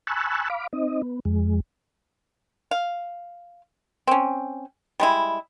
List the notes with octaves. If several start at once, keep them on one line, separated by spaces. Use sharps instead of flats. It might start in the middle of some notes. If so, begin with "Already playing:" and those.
G#5 A5 B5 C#6 E6 F#6
F5 B5 D6
C4 D#4 D#5
B3
F2 G#3
F5
C4 C#4
G3 G#3 E4